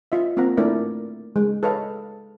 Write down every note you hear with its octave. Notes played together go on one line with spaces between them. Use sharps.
F4 D#5 E5
A#3 C4 F4 F5 F#5 A#5
A3 A#3 D4 E4 A#4 D5
G#3
A4 B4 C#5 D#5 F5